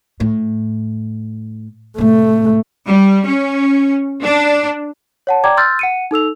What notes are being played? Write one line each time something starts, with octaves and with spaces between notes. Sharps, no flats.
A2
A2 C3 A3
G3
C#4
D4
C#5 F#5 A5
D5 G5 A#5 D6 G#6
C6 E6 F6 G6 A6
F#5 C#7 D#7
D#4 A4 E6 F7